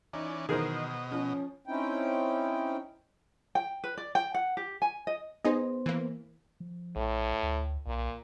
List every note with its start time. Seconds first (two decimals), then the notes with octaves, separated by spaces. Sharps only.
0.13 E3 C#4 D#4 D5
0.49 B2 D#3 E3 F#3 G#4 A#4 C5 D#5
1.12 F3 C#4
1.67 C4 C#4 D#4 E4 G5
3.55 G5
3.84 B4
3.98 D5
4.15 G5
4.34 F#5
4.57 G4
4.82 G#5
5.07 D#5
5.45 B3 D#4 G#4 C5 D#5
5.86 E3 A#3
6.60 F3
6.96 A#1 A2
7.43 D2
7.87 B1 A#2